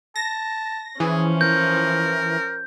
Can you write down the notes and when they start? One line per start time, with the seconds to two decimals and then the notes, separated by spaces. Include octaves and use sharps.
0.16 A5 A#6
1.00 E3 F3 C#4 G#4
1.41 A#4 G6